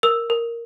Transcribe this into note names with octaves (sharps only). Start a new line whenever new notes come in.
A#4 E6
A#4